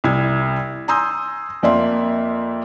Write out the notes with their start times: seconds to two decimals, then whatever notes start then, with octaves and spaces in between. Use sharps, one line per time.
0.04 C2 E4 G#6
0.88 G#5 A#5 C6 D#6 E6 G6
1.63 F2 A#3 D5 E5 C6